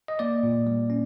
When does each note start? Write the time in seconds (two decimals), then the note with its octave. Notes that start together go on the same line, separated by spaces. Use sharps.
0.08 D#5
0.19 A#3 D5
0.43 A#2
0.67 G3
0.90 C#4